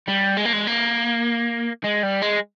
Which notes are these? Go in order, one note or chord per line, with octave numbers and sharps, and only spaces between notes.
G3
G#3
A#3
G#3
A#3
G#3
G3
G#3